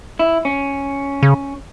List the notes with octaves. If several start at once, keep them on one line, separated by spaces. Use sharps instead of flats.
E4
C#4
C#3